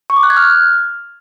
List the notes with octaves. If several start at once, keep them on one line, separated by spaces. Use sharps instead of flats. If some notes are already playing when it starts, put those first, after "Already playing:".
C#6
D6
F#6
G#6
F6